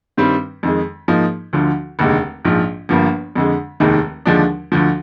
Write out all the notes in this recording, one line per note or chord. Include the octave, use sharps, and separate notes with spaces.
G2 D#3 G3 C4
F2 D#3 G#3
G#2 F3 A#3 D#4
D2 D3 F3
F1 D#2 D3 G#3
A#1 G#2 F3
G1 G2 F3 A#3
F2 D3 G#3
F1 D#2 D#3 G#3
D#2 D3 F3 G#3 D4
D2 D3 F3